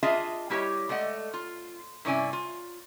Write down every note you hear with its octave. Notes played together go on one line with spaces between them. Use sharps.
D4 F4 G#4 D#5 E5 A5
G3 E4 G4 C5 C#5 D#5
G#3 A3 D5 D#5 F#5
F4
G2 C3 C#4 E4 D5 G#5
F4